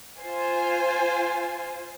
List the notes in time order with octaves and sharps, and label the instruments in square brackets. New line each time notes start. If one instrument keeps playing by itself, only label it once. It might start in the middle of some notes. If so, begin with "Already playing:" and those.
[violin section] F4 C5 G#5